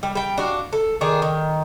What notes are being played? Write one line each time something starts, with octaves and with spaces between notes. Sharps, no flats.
G3
G3 G5
D4 F#4 F5
A4
D#3 D4 G#4
D#3